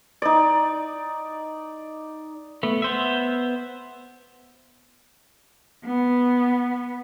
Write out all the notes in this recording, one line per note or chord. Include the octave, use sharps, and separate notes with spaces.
D#4 D5
A3 B3
B3 C5 E5
B3